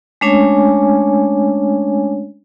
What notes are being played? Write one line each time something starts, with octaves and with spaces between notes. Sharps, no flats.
G#3 A3 C#4 D4 C#5 G#5